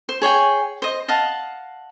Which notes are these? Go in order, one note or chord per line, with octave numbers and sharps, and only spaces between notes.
C5
G#4 C#5 G5 G#5
C5 D#5
D#5 F5 F#5 A5